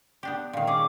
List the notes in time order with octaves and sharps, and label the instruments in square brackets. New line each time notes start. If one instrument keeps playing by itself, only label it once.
[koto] B3 D4 G4
[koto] A#2 D#3 [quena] F5
[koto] C#4 G#4 [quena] D6